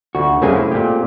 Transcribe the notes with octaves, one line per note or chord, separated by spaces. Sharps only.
D2 F#4
F#2 C#3 A3 A#3 C4 G#4
E4
A#2 G4